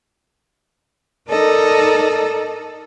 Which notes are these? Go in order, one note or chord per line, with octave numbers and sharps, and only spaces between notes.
D#4 A4 A#4 D5 D#5